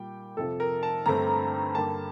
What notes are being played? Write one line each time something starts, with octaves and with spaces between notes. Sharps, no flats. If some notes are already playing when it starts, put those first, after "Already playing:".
Already playing: A#2 G3 A#3 G5
F2 C3 F3 A4
A#4
A5
G2 D3 A3 C4 A#5
G2 D3 G3 A#3 A5